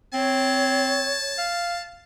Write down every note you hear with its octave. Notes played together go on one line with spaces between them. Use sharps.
C4 C#5 A5
F5